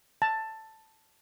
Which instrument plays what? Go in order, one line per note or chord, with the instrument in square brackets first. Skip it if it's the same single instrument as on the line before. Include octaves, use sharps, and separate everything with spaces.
[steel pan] A5